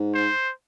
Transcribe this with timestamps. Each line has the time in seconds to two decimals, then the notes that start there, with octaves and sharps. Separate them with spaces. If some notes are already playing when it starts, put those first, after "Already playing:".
Already playing: G#2
0.14 C5